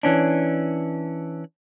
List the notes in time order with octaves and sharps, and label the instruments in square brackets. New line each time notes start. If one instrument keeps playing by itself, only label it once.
[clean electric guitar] E3 C#4 D4